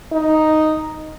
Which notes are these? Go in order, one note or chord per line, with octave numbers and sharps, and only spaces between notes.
D#4